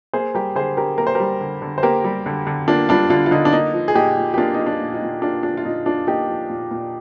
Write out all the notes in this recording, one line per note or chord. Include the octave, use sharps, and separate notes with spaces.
A#3 G#4 C5
G3 G4 A#4
D3 G#4 C5
D3 G4 A#4
A#3 A#4
C5
G3 G4 A#4
D3
D3
C5
A#3 G4 A#4
G3
D3
D3
A#3 D4 F4
G3 D4 F4
D3 D4 F4
F4
D3 D#4
D4
A#3 D#4
F3
G#4
A#2 D#4 G4
A#2
G4
A#3 D4 F4
F3 D#4
D4
A#2
D#4
A#2
A#3 D4 F4
F3 D4
F4
A#2 D#4
A#2 D4 F4
A#3 D#4 G4
F3
A#2
A#2